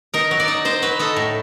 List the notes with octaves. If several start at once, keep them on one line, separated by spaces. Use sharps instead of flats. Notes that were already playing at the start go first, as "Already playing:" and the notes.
D#4 A#4
F#3
D5
D#4
D#4 C5
F#3 B4
D#4 A4
A2